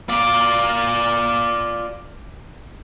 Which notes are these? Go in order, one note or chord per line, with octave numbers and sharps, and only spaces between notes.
F4 D5